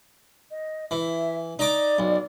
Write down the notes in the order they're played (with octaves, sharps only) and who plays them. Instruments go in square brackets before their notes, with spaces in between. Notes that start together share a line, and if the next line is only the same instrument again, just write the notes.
[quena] D#5
[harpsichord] E3 [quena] E5
[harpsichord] D#4 A#5 D6 [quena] D5
[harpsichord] B1